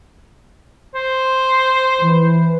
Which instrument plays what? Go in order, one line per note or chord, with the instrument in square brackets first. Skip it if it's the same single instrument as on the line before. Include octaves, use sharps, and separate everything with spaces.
[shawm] C5
[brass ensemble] E3 B4